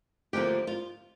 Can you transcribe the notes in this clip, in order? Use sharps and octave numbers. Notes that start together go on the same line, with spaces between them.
D2 D3 F3 A#3 G4
F4